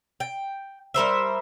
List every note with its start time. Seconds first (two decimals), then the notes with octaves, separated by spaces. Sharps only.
0.20 G5
0.94 G3 A#4 C5 E5